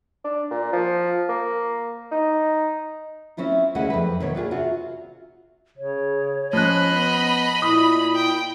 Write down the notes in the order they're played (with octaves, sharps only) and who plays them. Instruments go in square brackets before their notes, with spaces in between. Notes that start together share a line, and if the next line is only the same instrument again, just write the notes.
[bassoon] D4
A#2
F3
A#3
D#4
[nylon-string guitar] C4 C#4 E4 F4
D2 C#3 G#3 E4 F#5
F2 B4
D#2 B2 C#5
D4 F4 G4 G#4
C3 F4 F#4
[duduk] C#3 [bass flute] C#5
[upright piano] F3 F#6 [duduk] C#4 [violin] D#5 B5
[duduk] B3
[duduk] A#2 [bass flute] E4 [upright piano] D#6
[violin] G5